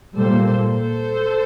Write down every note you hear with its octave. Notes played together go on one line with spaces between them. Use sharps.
A#2 G3 A#3 A4 C5
A4 C5